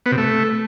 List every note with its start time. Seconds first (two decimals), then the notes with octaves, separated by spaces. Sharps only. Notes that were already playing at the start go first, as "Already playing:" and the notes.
0.06 B3
0.12 C3
0.18 A3